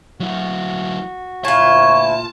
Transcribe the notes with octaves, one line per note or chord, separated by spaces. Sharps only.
F#3 E4 F#4
D2 A#2 E4 F4 C#5 A5